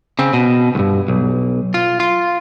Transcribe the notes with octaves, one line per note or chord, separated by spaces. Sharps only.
C#3 C4
B2
C2 G2
B1
F4
F4